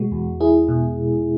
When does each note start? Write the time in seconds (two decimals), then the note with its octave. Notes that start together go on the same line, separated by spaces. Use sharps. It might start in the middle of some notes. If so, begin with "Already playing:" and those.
Already playing: B2 G#3 F#4
0.12 E2
0.40 E4 G#4
0.68 B2